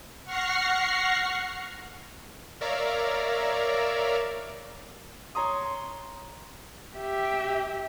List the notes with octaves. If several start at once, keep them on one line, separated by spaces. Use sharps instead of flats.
F#5 C#6 F6 A#6 C7
A#4 C#5 D5 E5 F5 A#5
C#5 A#5 C6 D#6
G4 E5